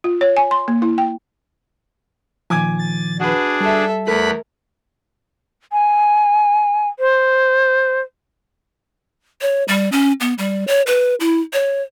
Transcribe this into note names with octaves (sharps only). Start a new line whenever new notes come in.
F4
C#5
G#5
C6
A#3
E4
G5
A#2 D#3 F3 G#5 D6 G#6
A6
D4 F#4 G#4 B4
G3 A4 E5
E2 A3 A#4 B5 F#6
G#5
C5
C#5
G3
C#4
B3
G3
C#5
B4
E4
C#5